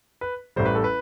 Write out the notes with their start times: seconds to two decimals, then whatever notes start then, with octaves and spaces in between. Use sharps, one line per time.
0.21 B4
0.56 A1 A2 G3 C5
0.66 B4
0.75 A4
0.84 B4